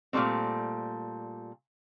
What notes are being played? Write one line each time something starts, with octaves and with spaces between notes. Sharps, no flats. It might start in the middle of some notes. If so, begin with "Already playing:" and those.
A#2 F#3 G3 A3 C4